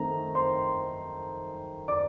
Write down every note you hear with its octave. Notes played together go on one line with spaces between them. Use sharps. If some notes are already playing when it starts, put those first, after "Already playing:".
Already playing: D#3 A3 C4 A#5
C5 C6
D5 D6